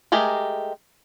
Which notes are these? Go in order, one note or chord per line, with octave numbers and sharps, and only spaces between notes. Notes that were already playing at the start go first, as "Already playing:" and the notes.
G#3 A3 G4 G#4 A#4